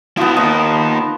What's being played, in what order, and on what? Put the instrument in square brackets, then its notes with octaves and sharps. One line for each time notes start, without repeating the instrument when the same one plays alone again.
[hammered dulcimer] F3 B3 [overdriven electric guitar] E4 F#4
[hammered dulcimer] F3 [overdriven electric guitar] A#3 D#4